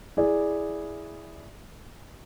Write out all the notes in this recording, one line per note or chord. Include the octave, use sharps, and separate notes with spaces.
E4 G#4 D5